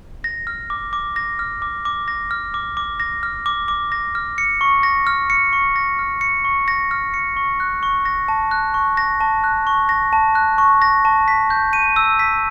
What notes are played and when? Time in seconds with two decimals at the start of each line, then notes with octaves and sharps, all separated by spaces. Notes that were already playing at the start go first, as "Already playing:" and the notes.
0.24 A#6
0.47 F6
0.70 D6
0.93 D6
1.16 A#6
1.39 F6
1.62 D6
1.85 D6
2.08 A#6
2.31 F6
2.54 D6
2.77 D6
3.00 A#6
3.23 F6
3.46 D6
3.68 D6
3.92 A#6
4.15 F6
4.38 C#7
4.61 C#6
4.83 A#6
5.07 F6
5.30 C#7
5.53 C#6
5.76 A#6
5.99 F6
6.21 C#7
6.45 C#6
6.68 A#6
6.91 F6
7.14 C#7
7.37 C#6
7.60 F#6
7.83 C#6
8.05 A#6
8.28 A5
8.51 F#6
8.74 C#6
8.97 A#6
9.21 A5
9.44 F#6
9.67 C#6
9.89 A#6
10.13 A5
10.35 F#6
10.58 C#6
10.82 A#6
11.05 A5
11.28 B6
11.50 G6
11.73 D#7
11.96 E6
12.19 B6